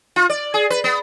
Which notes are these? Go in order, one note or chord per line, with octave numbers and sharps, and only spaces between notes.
F4
D5
G#4
B4
B3